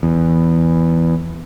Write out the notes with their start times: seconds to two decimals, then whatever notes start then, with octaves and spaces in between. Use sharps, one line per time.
0.03 E2